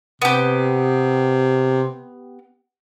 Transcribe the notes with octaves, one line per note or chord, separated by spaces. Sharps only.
C3 B3 G4